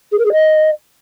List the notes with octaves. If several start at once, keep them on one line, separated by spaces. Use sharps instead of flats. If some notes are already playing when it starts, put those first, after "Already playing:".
G#4
A#4
G#4
D#5